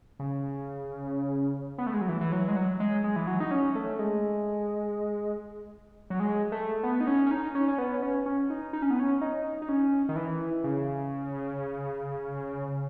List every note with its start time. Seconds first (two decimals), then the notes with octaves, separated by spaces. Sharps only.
0.19 C#3
1.78 B3
1.87 A3
1.93 G#3
2.01 F#3
2.09 E3
2.21 E3
2.32 F#3
2.48 G#3
2.56 F#3
2.80 G#3
3.04 G#3
3.16 E3
3.27 F#3
3.40 D#4
3.51 C#4
3.75 A3
3.99 G#3
6.10 F#3
6.20 G#3
6.52 A3
6.83 B3
7.00 D#4
7.07 C#4
7.26 C#4
7.31 D#4
7.55 C#4
7.68 C#4
7.78 B3
8.02 C#4
8.26 C#4
8.50 D#4
8.73 D#4
8.82 C#4
8.91 B3
9.00 C#4
9.21 D#4
9.62 D#4
9.69 C#4
10.09 D#3
10.16 E3
10.64 C#3